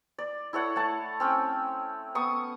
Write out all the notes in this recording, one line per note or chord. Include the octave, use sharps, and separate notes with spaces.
D5
E4 A4 C#5 F#5
A3 F#5 A5
C4 C#4 G5
B3 C#6 D#6